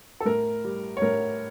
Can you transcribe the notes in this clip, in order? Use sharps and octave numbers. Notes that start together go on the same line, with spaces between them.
A4
A2 A#4
G3
C#5
A2 A#4